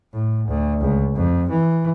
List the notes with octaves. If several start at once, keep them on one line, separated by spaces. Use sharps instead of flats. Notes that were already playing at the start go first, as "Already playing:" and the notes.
A2
D2
C#2
F2
E3